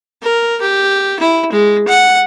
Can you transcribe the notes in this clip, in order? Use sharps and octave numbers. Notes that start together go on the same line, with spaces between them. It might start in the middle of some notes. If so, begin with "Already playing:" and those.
A#4
G4
E4
G#3
F#5